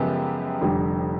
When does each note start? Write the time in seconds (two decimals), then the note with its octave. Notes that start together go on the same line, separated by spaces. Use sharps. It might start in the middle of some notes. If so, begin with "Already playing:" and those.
Already playing: F#2 C#3 F3 G#3 B3 G4
0.62 F1 F2 D3 G3